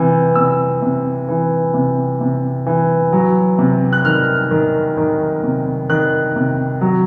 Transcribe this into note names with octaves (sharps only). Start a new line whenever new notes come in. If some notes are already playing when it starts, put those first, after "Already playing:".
Already playing: C3 E3
C3 E6
C3
E3
C3
C3
E3
F#3
C3
F#6
D#3 F6
D#3
D#3
C3
D#3 F#6
C3
F#3